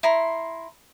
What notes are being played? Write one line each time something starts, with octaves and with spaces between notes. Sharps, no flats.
E4 A#5 C6